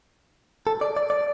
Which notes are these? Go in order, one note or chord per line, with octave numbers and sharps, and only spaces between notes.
A4
D5
D5
D5